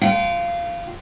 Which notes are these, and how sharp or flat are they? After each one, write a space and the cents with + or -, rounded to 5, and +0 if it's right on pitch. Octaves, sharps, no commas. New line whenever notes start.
F4 -15 G5 -40